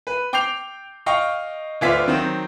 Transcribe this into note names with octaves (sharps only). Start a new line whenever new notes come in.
B4
G5 D6 G6 C7 F7
D#5 F5 G5 C#6
D2 B3 F4 D5 E5 B6
D#3 F#3 C4